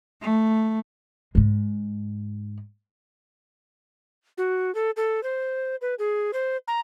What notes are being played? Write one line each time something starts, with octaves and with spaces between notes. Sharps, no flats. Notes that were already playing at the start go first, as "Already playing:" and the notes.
A3
G#2 G#3
F#4
A4
A4
C5
B4
G#4
C5
A#5